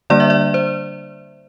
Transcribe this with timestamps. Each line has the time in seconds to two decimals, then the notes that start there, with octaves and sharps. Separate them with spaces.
0.10 D3 G3 A#3 D4 D5
0.20 E5
0.30 D5
0.54 C5